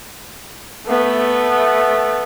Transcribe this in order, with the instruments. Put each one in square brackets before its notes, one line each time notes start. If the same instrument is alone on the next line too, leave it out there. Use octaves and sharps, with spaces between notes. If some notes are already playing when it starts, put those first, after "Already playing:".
[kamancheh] A3 B3